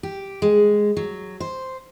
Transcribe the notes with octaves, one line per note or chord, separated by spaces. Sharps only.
G4
G#3
F#3
C5